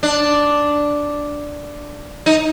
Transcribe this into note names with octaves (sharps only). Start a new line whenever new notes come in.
D4
D#4